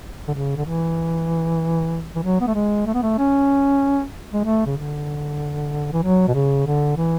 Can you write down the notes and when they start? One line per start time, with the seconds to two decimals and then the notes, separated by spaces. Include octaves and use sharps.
0.28 D3
0.34 C#3
0.57 D3
0.65 E3
2.15 E3
2.23 F#3
2.41 B3
2.47 A3
2.54 G#3
2.86 A3
2.94 B3
3.02 A3
3.18 C#4
4.33 G#3
4.44 A3
4.66 C#3
4.77 D3
5.92 E3
6.03 F#3
6.28 B2
6.34 C#3
6.66 D3
6.97 E3